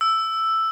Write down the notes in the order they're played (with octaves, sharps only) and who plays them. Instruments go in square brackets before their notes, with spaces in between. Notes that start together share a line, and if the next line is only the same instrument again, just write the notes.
[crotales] E6